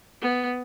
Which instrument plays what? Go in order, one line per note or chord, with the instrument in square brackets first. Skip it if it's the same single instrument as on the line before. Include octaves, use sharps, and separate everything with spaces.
[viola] B3